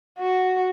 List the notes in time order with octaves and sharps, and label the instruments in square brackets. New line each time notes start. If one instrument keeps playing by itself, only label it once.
[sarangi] F#4